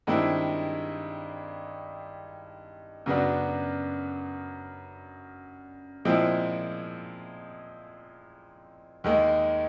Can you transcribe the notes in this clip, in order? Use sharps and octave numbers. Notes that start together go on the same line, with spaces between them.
G2 D#3 G#3 C4 E4
F#2 C#3 F#3 B3 D4
A#2 F3 G#3 C4 E4
D#2 D#3 G#3